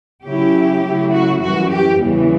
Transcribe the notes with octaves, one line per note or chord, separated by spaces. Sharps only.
C#3 F#3 C#4 E4 G4
C#3 F#3 A3 E4
F#4
F#2 E3 G3 F#4
G4
E2 C#3 E3 G3